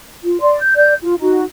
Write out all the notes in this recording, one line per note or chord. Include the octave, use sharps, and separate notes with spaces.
F4
D5 C6
G6
D5 G6
F4
D#4 F#4